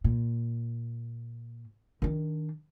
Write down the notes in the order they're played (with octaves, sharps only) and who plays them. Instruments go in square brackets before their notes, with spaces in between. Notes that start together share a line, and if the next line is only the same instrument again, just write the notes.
[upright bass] A#2
D#3 D4